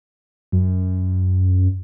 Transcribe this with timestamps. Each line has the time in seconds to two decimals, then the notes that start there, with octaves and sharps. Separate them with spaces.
0.52 F#2